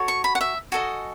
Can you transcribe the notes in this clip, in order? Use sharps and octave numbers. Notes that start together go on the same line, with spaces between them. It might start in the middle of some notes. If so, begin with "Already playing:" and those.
Already playing: F#4 A4 C#5
C#6
B5
F#5
E5
F#4 A4 D#5 G#5